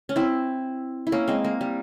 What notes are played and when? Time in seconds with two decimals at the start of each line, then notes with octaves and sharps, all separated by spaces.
0.09 C#4
0.16 C4 E4
1.07 E4
1.12 A#3 C#4
1.28 G#3 C4
1.44 A#3
1.61 G3